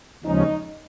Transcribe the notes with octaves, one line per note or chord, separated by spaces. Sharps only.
D#2 C#3 F3 G#3 C#4 D#4